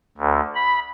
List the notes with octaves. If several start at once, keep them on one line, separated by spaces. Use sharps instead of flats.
D2
B5